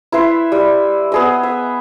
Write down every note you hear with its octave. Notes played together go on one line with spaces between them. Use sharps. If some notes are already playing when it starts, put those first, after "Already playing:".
E4 B4 E5 C6
G3
B3 G#4 D#5
E5